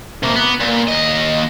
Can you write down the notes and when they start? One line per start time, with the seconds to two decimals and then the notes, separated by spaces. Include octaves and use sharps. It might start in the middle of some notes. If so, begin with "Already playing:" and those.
0.23 C3 A#3
0.36 B3
0.60 A#2
0.87 D#2 D#5